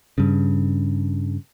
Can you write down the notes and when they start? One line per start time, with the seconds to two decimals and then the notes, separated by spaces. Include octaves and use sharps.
0.18 G2 C#3